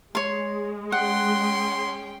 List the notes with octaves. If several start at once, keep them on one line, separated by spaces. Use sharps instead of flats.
G#3 C#5 C6
C#4 F#5 G5 C6